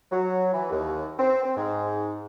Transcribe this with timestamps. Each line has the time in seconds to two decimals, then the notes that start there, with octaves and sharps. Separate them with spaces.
0.11 F#3
0.53 E3
0.70 D#2
1.18 C4
1.43 C4
1.56 G#2